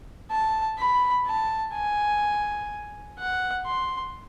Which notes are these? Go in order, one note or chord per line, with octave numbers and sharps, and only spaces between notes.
A5
B5
A5
G#5
F#5
C6